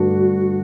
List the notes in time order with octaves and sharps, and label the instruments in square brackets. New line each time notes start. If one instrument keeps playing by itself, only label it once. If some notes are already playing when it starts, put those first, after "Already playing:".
Already playing: [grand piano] G2 D3 A3 D4 [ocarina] F#4